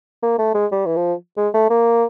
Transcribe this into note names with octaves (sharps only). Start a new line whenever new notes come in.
A#3
A3
G#3
G3
E3
F3
G#3
A3
A#3